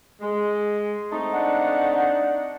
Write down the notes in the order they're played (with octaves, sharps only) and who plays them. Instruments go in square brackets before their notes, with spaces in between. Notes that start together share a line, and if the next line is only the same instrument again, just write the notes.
[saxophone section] G#3
A3 C4 D#4
[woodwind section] D4 F#5